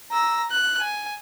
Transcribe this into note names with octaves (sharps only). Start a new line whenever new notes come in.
A#5 E6
F#6
G#5